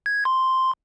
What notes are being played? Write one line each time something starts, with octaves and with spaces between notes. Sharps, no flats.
G#6
C6